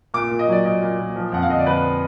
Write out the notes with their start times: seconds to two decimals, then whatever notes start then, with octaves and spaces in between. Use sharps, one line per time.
0.14 A#2 D6
0.31 A#2
0.39 D#5
0.48 F#3 D5
0.64 A#2 D#5
0.82 A#2
0.99 A#2
1.16 F3
1.32 F2 F#5
1.42 F5
1.49 D3 D#5
1.59 D5
1.66 F2 B4